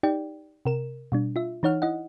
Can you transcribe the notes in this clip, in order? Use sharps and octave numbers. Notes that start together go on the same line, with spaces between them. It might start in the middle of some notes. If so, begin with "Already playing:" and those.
D#4 G4 D5 G5
C3 A#4 E7
B2 G3 D4
F4 E5
E3 D#4 C#5 F#5 F6
E4 D#5 F#5